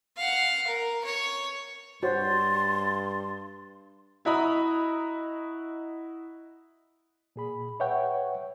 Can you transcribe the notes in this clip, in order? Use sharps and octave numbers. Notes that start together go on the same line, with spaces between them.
F5 F#5
A#4
C#5
G2 F#4 C5 C#5 C6 A6
E4 F#4 D#5 A#5 B5 D#6
A#2 G#4 B5
B4 C#5 E5 F#5 G5 C#6